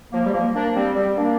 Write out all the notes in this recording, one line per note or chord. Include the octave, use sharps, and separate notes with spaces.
F3 A#3
G3
F3 A#3
A#3 D4
G3 C4
G3 C4
A#3 D4